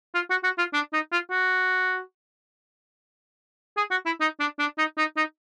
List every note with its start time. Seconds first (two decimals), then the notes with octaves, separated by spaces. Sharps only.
0.15 F4
0.30 F#4
0.44 F#4
0.58 F4
0.74 D4
0.93 D#4
1.12 F4
1.31 F#4
3.77 G#4
3.91 F#4
4.06 E4
4.21 D#4
4.40 D4
4.59 D4
4.78 D#4
4.98 D#4
5.17 D#4